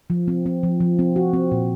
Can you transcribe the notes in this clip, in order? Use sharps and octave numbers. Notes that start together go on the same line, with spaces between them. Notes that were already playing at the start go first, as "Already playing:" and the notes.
F3
C4
C4
F3
F3
C4
F#4
C4
A#2